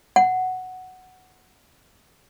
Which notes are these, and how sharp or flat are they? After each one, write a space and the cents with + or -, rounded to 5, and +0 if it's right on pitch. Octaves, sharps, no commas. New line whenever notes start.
F#5 +5